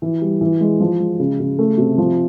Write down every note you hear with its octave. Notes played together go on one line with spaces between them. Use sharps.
E3
G3
E3
G#3
F3
G#3
C#3
C#3
A3
C3
F3